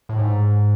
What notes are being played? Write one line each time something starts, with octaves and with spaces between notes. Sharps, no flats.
A2
G#2